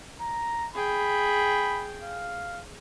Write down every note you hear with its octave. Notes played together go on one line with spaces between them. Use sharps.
A#5
G#4 G5 B5
F5